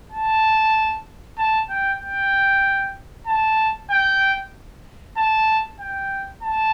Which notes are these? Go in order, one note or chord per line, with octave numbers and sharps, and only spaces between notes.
A5
A5
G5
G5
A5
G5
A5
G5
A5